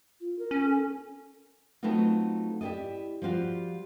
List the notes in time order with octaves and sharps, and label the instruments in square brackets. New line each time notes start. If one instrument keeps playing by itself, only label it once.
[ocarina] F4
A#4
[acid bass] C#4
[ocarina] A4
[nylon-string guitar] F#3 A3 B3 C4 D#4 F4
E4 G4 G#4 D5 D#5
F3 G3 F4 F#4